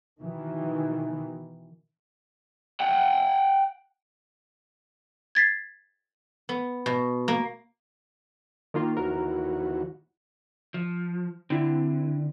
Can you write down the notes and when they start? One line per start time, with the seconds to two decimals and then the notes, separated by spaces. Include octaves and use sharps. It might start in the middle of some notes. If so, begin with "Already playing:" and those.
0.19 B2 D#3 E3
2.80 F#5 G5
5.35 G#6 A6 B6 C7
6.49 B3
6.86 B2
7.28 A#3
8.74 D#3 A#3 F4
8.97 D#2 E3 F#4 A#4
10.74 F3
11.50 D3 C4 E4